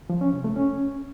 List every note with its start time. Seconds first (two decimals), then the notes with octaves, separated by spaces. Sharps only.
0.10 F3
0.21 C#4
0.33 C3
0.44 A3
0.56 C#4